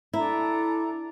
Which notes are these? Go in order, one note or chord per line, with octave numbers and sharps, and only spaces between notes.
D4 E4 A4 A#5